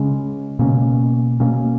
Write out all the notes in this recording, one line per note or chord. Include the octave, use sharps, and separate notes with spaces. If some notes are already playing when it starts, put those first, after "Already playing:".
Already playing: C#3 G#3 C#4
B2 A#3 C#4
B2 A#3 C#4